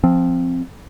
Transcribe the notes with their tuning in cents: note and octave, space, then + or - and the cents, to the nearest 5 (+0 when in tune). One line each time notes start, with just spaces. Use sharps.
F3 -5 C4 +0